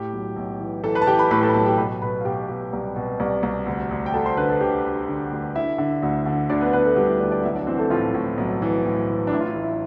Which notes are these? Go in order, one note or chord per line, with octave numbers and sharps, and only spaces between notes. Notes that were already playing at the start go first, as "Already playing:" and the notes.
Already playing: A2 G4 G5
B1
B1
E3
E3 A4 A5
B4 B5
A5
E3 G4 G5
B4 B5
A2 B4 B5
A4 A5
B5
B1 A4 A5
G4 G5
B2 B4 B5
B2 B4 B5
F5
B2 G4 G5
B2
C2
B2
C2
C2
D2
D2
G5
D2 A4 A5
C5 C6
D3 B4 B5
A4 A5
D3 G4 G5
D3
D3
D2
D3 E4 E5
D3
D2
D3
D2 D4 D5
B3 B4
D3 B3 B4
A3 A4
D3 G3 G4
E4
D2 D4 D5
D4 D5
B1 E4 E5
D4 D5
E3 C4 C5
A3 A4
A2 F3 F4
A2
B1
E3
A2
E3
D4
A2 E4
F4
E4
A1
E4